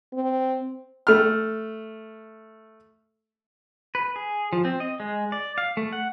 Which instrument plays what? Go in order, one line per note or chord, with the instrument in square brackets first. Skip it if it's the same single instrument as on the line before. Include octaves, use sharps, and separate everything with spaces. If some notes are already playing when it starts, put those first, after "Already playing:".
[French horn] C4
[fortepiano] A3 F6
[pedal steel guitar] B4
G#4
F3
C4
D#5
G#3
D5
F5
A3
F#5